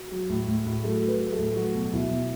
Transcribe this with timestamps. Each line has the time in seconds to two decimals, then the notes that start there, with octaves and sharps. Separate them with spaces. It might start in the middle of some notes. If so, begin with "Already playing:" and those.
Already playing: F#4
0.11 F#3
0.29 A2
0.47 A2
0.66 A2
0.83 F#3 A4
1.02 F#3
1.08 B4
1.20 F#3
1.33 A4
1.38 A2
1.56 F#3 F#4
1.75 B2
1.93 B2 E4
2.11 B2